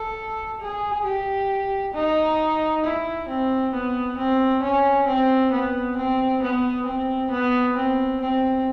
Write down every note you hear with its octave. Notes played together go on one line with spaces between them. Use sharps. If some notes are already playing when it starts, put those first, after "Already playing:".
Already playing: A4
G#4
G4
D#4
E4
C4
B3
C4
C#4
C4
B3
C4
B3
C4
B3
C4
C4